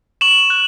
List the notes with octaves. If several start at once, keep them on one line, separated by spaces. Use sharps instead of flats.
C#6 E7 F#7
F#6